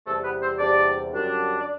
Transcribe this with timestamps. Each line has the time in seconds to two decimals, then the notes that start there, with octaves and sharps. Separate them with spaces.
0.06 E2 C3 G3 A3 A4
0.24 B3 B4
0.41 C4 C5
0.58 E2 C3 G3 D4 D5
1.12 F#2 D3 G3 D4
1.61 D5